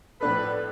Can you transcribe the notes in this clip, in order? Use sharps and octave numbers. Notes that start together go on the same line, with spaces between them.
A2 F3 B3 D4 A4 B4